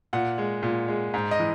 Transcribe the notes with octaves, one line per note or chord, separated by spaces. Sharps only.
A#2 F#5
G#3
A#2
G#3
G#2
D#5
E3